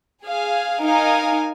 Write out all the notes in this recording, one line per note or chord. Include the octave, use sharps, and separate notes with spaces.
G#4 F5 G#5
D#4 A#4 F5 G#5